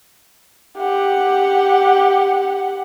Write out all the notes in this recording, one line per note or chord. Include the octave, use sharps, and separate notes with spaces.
G4 F#5